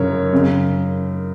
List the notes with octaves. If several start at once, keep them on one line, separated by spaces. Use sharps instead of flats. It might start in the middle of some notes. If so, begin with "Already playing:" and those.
Already playing: F#2 C#3 A#4 C#5
F#2 C#3